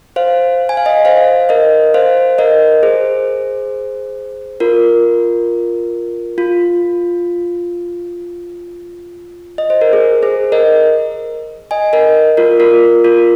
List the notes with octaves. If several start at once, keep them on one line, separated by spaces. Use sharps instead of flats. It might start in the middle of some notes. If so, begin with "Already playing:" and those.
C5 F5
G#5
F5
D#5 G#5
C5 F5
A#4 D#5
C5 F5
A#4 D#5
G#4 C5
F4 A#4
F4
D#5
C5
A#4
G#4
G#4 C5
A#4 D#5
D#5 G#5
A#4 D#5
F4 A#4
F4 A#4
F4 A#4